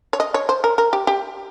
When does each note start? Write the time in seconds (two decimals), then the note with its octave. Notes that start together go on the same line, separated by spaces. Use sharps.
0.13 C#5
0.20 D#5
0.34 C#5
0.49 C5
0.64 A#4
0.78 A#4
0.93 G4
1.07 G4